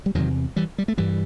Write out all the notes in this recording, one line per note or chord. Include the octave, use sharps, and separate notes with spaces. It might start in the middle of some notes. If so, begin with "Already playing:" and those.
G3
E2 C3 D#3 F#3
E3 G3
G3
A3
G2 E3 G3